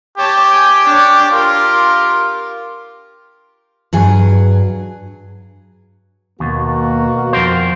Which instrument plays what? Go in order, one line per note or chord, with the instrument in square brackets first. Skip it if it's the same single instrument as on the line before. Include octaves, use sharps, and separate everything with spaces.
[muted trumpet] G4 [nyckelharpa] C#5 A5
[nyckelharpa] G5 G#5
D4 C#5
[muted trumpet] F4 [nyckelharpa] G4 A#4
[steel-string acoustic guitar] G2 F#3 G#4 G#5
[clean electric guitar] D#2 [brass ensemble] B2 A#3 F#4
[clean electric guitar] F2 A#4 C5